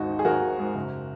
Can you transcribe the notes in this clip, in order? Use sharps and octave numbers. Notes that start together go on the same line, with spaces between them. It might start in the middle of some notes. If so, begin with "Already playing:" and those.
Already playing: G#1 D#2 G#2 D#4 F#4
D#3
G#4
G#1 F#4 A#4
G#1
G#2
F#1